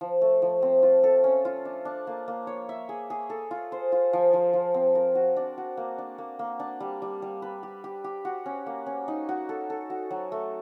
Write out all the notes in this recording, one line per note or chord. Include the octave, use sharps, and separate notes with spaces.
F3
A3
F3
C4
F4
A4
C#4
F4
D4
D4
A#3
A#3
C#5
E5
G#4
G#4
A4
F4
C5
F4
F3
F3
F3
C4
A#4
F#4
D4
F#4
A#3
D4
A#3
A#3
D4
G3
G3
G3
B4
G4
G4
G4
F#4
C#4
A#3
C#4
D#4
F#4
A4
A4
F#4
F#3
A3